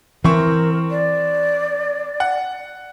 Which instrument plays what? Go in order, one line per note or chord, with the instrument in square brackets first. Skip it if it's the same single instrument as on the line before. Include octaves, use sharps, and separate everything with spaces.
[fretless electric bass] E3 [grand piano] C4 C5 C#6 [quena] A#4
[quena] D5
[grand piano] F#5